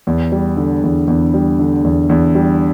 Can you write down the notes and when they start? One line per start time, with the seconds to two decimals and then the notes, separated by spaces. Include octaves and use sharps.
0.07 E2
0.32 G3
0.57 D3
0.83 E2
1.08 E2
1.34 G3
1.59 D3
1.84 E2
2.10 E2
2.35 G3